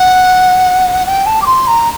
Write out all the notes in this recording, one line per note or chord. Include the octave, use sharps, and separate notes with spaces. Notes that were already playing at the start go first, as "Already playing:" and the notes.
Already playing: F#5
G5
A5
D6
C6
A#5